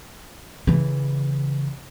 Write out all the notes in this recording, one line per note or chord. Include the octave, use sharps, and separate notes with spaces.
C#3 E3